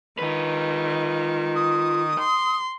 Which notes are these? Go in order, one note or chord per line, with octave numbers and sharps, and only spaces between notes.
D#3 F4 B4
D#6
C6